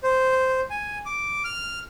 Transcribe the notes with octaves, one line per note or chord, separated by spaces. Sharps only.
C5
G#5
D6
F6